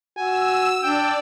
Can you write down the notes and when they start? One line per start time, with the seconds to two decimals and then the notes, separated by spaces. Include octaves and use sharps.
0.18 F#4 G#5 E6
0.83 D4 D5 G5